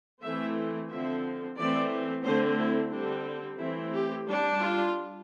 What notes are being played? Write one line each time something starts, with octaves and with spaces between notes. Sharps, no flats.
E3 A3 C4 E5
D3 F3 C4 E5
E3 A3 C4 D5
D3 A3 C4 C5
E4
D3 G3 C4 D4
E3 A3 C4 E4
G4
G3 D4
F4